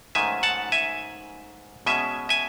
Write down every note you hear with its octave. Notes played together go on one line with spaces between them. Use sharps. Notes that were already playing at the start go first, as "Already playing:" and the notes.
G#2 D#3 F#3 A3 C#4 E5 G#5
F#5 A5
E5 G#5
B2 G#3 C#4 E5 G#5
E5 G#5